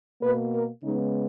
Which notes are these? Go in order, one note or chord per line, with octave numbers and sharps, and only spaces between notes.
B2 A#3 B4
A#4
C#3 G#3 B3 D#4